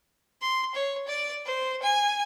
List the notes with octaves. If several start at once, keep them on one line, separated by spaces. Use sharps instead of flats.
C6
C#5
D5
C5
G#5